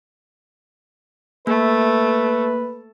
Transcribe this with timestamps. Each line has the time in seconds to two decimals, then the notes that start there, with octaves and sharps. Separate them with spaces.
1.47 A3 A#3 B4